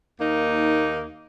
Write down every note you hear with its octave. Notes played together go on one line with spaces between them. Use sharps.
D#2 A#3 D#4